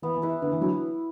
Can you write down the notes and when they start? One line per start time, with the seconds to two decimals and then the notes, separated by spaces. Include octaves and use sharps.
0.02 E3 B3
0.16 E3
0.22 E4 B4 E5
0.42 D3 B3
0.52 E3
0.61 D3 F#3 E4